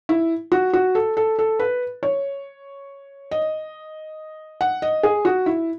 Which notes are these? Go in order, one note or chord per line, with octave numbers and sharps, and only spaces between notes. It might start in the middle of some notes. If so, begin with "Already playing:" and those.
E4
F#4
F#4
A4
A4
A4
B4
C#5
D#5
F#5
D#5
G#4
F#4
E4